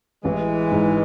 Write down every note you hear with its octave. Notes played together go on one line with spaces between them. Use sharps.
A1 E3 G#3
G#2